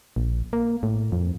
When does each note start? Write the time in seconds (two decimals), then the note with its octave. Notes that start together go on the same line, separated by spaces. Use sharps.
0.16 A#1
0.53 A#3
0.83 A2
1.12 F2